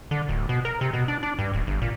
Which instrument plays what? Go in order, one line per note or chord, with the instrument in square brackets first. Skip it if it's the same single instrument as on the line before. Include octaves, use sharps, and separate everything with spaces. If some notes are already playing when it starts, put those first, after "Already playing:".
[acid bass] D3
D1
B2
A#4
C3
B2
D4
D4
G2
D1
G1
A#2